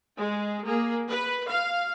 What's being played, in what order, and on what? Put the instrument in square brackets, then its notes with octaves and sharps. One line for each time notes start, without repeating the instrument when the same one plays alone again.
[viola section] G#3 G#4
A#3 G#4
B4
F5